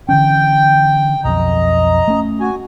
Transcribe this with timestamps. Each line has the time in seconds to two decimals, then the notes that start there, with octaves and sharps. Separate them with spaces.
0.09 D3 E3 C#4 G5
1.24 B1 F2 D#5 A#5
2.08 A3 C#4
2.40 F#4 G#5